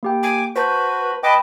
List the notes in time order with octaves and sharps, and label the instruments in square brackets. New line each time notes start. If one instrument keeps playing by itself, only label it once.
[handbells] A#3 G4 G5
[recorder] G#5 [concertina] D6
[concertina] F#4 [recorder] B4 [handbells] C5 A5 G6
[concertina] B4 D#5 D6 [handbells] G5 B5 [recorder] A5